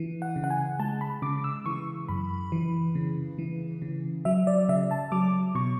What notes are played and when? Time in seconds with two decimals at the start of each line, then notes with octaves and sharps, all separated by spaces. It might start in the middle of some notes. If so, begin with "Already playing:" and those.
Already playing: E3
0.22 F#5
0.36 C#3
0.44 F#5
0.50 G#5
0.79 G#3 A5
1.01 B5
1.22 C#3 D6
1.44 E6
1.66 E3 C#6
2.08 F#2 B5
2.52 E3
2.95 C#3
3.39 E3
3.82 C#3
4.25 F#3 E5
4.47 D5
4.69 C#3 E5
4.91 A5
5.12 F#3 D6
5.55 B2 C#6